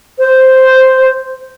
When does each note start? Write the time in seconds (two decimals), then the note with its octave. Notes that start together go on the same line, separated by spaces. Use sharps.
0.19 C5